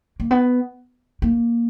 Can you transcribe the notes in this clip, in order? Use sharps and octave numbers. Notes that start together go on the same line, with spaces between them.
A#3
B3
A#3